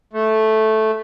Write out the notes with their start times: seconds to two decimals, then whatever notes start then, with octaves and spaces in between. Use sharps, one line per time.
0.13 A3